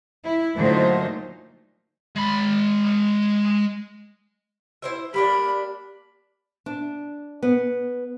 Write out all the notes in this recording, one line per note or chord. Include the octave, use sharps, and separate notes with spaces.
E4
A#2 D3 F#3 A3 D#4 C5
G#3 B5
E4 C5 E5
G3 A#3 D4 B5
D4
B3